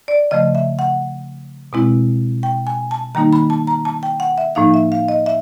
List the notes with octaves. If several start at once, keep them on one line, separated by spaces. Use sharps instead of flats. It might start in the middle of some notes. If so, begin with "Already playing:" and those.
D5
C#3 F3 A3 D#5
E5
F#5
B2 G#3 C4 E4
G5
G#5
A5
D#3 G3 A#3 D#4 A#5
B5
A5
A#5
A5
G5
F#5
E5
A2 F3 A#3 D#4 F5
E5
F5
D#5
E5